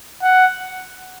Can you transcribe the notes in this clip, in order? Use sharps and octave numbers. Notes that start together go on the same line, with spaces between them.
F#5